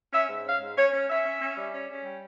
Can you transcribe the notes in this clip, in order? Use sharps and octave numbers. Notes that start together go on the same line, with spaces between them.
C#4 E5
G#2
C#4 F5
G#2
C#4 C#5
C#4
C#4 E5
C#4
C#4
G3
C#4
C#4
G3